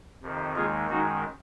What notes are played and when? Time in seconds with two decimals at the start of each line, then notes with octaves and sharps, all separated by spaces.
0.22 F2 C3 D#3
0.56 D#2 D#3 G#3 F4 G#4
0.90 F#2 D#3 G#3 D#4 F#4